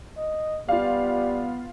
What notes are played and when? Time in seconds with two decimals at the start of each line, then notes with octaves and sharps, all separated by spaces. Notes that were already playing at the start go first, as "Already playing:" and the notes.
0.18 D#5
0.69 G3 B3 F4 F5